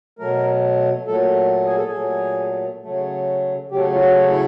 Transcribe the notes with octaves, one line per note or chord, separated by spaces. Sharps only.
B2 F#3 A3 A#4
A#2 F#3 A3 A4
G#4
A4
G#4
A#2 F#3 A3
C#3 F#3 A3
C#3 F#3 A3 G4
F4
F#4
E4